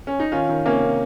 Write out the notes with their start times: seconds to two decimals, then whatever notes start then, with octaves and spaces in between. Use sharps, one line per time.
0.07 C#4
0.20 D#4
0.32 D#3 C#4 F4
0.49 D#3
0.66 C3 A#3 C#4
0.82 C3